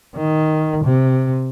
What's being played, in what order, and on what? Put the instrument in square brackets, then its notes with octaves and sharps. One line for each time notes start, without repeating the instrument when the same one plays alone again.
[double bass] D#3
C3